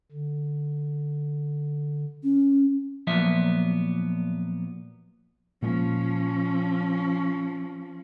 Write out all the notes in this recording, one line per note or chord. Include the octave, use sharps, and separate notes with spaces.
D3
C#4
A#2 F3 F#3 B3 E5
A#2 F3 G#3 C#4